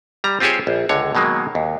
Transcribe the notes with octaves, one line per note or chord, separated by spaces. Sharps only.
G3 A#5
C4 F4 G4 G#4 C5 C#5
A#1
C#2 D3 C#5
B2 D#3 F#3 G#3 A#3
D#2